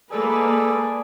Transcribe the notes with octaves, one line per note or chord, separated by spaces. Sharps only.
G#3 A#3 G#4 A4 B4 D5